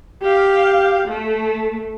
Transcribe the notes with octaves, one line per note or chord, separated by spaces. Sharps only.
G4 F5
A3